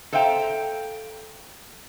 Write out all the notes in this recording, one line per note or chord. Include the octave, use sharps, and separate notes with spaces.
A4 C5 E5 F5 G5 A#5